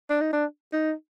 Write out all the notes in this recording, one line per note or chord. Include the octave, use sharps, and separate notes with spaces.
D4
D#4
D4
D#4